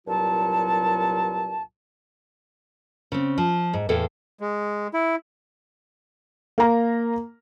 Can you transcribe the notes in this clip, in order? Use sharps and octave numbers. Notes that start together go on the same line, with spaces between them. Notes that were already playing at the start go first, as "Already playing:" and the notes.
C2 G2 A#2 F#3 F4 A5
C#3 C4
F3
G#2
E2 A2 A4 F5 G5
G#3
E4
A#3 A#5